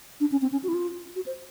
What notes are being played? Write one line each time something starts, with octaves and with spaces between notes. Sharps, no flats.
D4
C#4
C4
C#4
F#4
E4
F4
F#4
C5